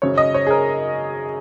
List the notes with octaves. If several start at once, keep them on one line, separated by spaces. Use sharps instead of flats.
G#1 F#2 C#3 C#5
D#5
C#5
G#4
A#4